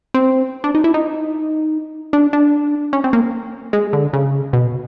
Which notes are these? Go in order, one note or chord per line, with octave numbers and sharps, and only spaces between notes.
C4
D4
D#4
E4
D#4
D4
D4
C#4
C4
A#3
G#3
D3
C#3
B2